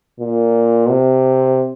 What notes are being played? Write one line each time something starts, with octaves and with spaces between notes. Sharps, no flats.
A#2
C3